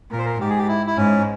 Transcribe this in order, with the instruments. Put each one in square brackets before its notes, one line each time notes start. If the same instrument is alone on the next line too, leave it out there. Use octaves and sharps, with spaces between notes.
[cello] A#2 [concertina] A#4
[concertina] C5
A#4
[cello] G#2 [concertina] G4
[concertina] G#4
G4
E4
E4
[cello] G#2 [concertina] C#4